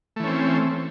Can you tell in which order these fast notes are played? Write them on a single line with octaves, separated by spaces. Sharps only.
A3 E3 C#4 C4